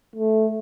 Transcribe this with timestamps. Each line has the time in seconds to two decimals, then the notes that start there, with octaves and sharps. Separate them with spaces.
0.16 A3